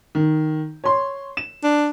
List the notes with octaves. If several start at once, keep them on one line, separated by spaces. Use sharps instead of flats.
D#3
C#5 C6
E7
D4